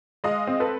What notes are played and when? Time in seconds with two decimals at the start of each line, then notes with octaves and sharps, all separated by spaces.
0.24 G#3 D#5 F5
0.47 C4
0.60 A4 B4